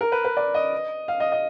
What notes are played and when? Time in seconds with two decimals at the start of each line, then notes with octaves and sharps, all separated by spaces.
0.01 A#4
0.12 B4
0.24 B4
0.37 D5
0.54 D#5
1.08 F5
1.20 D#5
1.32 D#5